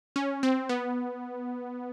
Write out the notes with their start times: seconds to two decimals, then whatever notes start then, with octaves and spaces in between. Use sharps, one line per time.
0.16 C#4
0.43 C4
0.69 B3